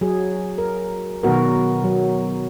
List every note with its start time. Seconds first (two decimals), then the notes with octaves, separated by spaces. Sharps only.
0.01 F#3 G#4
0.58 A#4
1.23 B2 D#3 F#3 B3 F#4 A#4
1.84 F#3